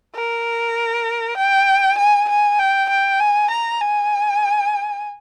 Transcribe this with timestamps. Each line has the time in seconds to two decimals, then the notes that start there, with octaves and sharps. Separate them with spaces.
0.15 A#4
1.37 G5
1.98 G#5
2.29 G#5
2.59 G5
2.89 G5
3.20 G#5
3.50 A#5
3.81 G#5